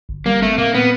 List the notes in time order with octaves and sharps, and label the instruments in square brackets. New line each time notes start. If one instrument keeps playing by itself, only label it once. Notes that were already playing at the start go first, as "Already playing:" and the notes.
[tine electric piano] G1
[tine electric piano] G3 [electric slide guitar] A#3
[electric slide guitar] A3 [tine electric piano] C4
[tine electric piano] A#2 [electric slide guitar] A#3
[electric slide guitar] B3 [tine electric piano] C4